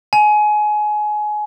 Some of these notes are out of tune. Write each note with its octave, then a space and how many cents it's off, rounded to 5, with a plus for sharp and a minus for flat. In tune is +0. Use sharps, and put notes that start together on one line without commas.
G#5 +25